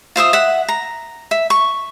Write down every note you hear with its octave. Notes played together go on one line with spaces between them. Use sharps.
F4 C5 E5 D#6
E5 F#5
A#5
E5
C#6